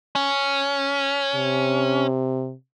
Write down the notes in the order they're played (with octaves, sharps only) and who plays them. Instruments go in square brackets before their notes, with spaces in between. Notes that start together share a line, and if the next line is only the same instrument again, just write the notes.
[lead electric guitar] C#4
[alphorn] C3